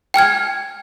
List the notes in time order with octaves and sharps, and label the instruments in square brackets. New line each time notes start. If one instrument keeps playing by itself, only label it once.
[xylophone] G5 G#5 F6 G#6